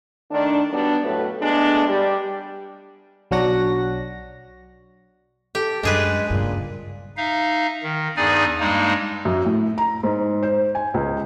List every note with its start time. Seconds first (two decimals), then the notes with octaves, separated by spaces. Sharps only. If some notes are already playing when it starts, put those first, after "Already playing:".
0.31 D#3 A3 D4
0.71 F#3 G3 B3 D4
1.04 F2 A2 F#3 A3 B4
1.41 G#3 A3 B3 D4
1.87 G3
3.31 B1 F#3 D4 F#4 F#5 A#6
5.55 G4 A4
5.83 F#2 G3 G#3 D4 G#4 B4
6.30 G2 A#2 C#3
7.17 D#4 E5 F5
7.83 D#3
8.16 E2 G2 D#4 G#4 D5 G#5
8.60 G2 G3 G#3 A#3 D#4
9.25 F#2
9.45 A2
9.78 A#5
10.03 G#2
10.43 C5
10.75 G#5
10.94 C#2